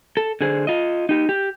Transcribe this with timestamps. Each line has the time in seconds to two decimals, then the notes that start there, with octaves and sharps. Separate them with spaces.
0.17 A4
0.41 D3 G#4 C5
0.67 F4 D#5
1.09 D#4 G4
1.29 G4